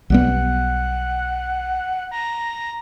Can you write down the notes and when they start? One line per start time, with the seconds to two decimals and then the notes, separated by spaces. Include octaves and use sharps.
0.10 B1 G3 B3 F#5
2.11 A#5